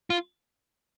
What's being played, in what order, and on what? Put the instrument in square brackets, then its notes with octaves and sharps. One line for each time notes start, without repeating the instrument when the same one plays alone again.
[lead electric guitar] F4